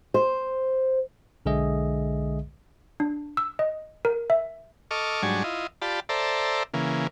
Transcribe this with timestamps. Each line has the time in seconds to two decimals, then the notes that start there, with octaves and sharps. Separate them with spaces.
0.14 C5
1.46 B1 D3 G#3 G#4 D#5 E5
3.00 D4
3.37 E6
3.59 D#5
4.05 A#4
4.30 E5
4.91 A4 D#5 C#6 D6 F6
5.23 G#2 F#3 G3 D4 G#5 C#6
5.44 E4 F4 D#5
5.82 F4 G4 D5 A5 B5
6.09 A4 C5 D5 E5 A#5
6.74 C#3 E3 A#3